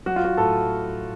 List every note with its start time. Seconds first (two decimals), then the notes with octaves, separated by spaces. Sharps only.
0.06 F#3 F#4
0.16 F4
0.25 F#4
0.37 A2 A4